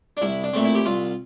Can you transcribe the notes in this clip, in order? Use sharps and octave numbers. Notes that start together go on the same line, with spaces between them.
D4
C2 E4
D4
A#2 A3 C4
E4
G4
C2 F4